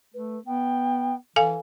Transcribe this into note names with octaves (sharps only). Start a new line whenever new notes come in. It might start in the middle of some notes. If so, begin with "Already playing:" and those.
A3 B4
B3 G5
E3 A4 F5 G#5